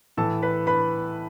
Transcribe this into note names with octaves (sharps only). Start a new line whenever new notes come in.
A2 E3 A4 A5
B4 B5
B4 B5